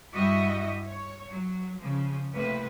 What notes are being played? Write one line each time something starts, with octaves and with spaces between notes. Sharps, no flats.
G2 G3 E4 F#4 D#5 E5
C#5
F#3
C#3 F3
A2 C3 A#3 B4